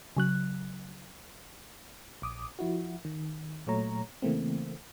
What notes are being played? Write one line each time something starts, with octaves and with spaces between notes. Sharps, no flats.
C#3 F#3 F#6
A#1 D6 D#6
F3 E4 F#4
D#3
A#2 F#3 A3 C#5 A#5
C#3 E3 A3 A#3 C4